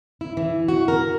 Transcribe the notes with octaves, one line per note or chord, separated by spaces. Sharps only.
E4
E3
F#4
A#4